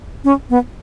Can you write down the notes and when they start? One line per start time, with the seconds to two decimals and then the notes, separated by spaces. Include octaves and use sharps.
0.24 C#4
0.50 B3